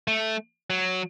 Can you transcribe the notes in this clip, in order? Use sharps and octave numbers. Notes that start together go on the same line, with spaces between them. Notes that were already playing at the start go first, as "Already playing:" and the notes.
A3
F#3